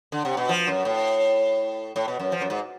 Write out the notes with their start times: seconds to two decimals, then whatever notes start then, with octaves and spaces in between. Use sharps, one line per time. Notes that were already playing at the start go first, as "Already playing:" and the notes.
0.12 D3
0.25 C3
0.37 B2
0.49 F3
0.67 F#2
0.85 A2
1.96 A2
2.08 B2
2.19 F#2
2.32 F3
2.41 F#2
2.50 G#2